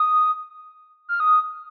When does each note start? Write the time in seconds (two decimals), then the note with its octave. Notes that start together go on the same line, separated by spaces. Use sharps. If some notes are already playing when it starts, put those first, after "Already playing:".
Already playing: D#6
1.09 F6
1.20 D#6